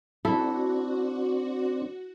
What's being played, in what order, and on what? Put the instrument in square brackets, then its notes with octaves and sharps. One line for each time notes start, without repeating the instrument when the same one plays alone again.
[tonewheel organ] C4 D4 [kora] E4 A4 [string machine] F#4